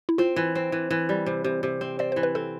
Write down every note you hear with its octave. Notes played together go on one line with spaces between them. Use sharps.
E4
C4 F4
E3
C4
E3
E3
G3
C3
C3
C3
C4
C4 D5
E3 C5
B4
C4 A4